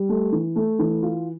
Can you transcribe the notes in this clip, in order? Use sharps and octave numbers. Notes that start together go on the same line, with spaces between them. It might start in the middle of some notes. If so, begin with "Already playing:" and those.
Already playing: G3
A3
E3
A3
E3
F4